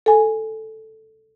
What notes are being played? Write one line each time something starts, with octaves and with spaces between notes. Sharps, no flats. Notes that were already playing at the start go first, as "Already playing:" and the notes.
A4 G#5